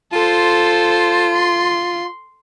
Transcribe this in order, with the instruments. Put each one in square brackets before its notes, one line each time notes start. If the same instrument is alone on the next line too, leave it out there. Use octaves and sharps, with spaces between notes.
[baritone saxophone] F4 [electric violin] A4 C5
[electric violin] C6